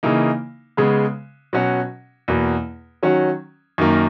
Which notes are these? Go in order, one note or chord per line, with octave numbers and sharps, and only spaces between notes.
C#3 E3 A#3 D#4
C#3 G#3 B3
B2 F#3 C#4 F#4
E2 B2 A#3
D#3 F#3 C#4 F#4
F#2 D#3 A#3